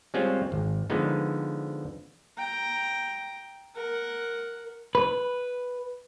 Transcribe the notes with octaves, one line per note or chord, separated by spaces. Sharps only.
G3 G#3 C4 C#4 F4
G#1
D3 F3 G#3 B3 D#4
G5 A#5
A#4 F#5
B4